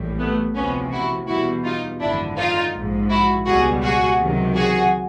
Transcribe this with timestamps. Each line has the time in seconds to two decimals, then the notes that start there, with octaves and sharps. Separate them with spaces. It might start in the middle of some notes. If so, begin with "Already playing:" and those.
Already playing: A#1 A2 E3 G3
0.19 A3 B3
0.55 D2 C3 F3 B3 C#4
0.92 E4 F#4
1.28 E2 B2 G3 E4 F#4
1.65 D#4 F4
2.01 G#1 F#2 D3 F3 D4 E4
2.38 D#4 F4
2.75 A#1 G#2 F3
3.10 E4 F#4
3.46 C#2 B2 G3 F#4 G#4
3.83 F#4 G#4
4.20 C#2 C3 D#3 F#3
4.56 F#4 G#4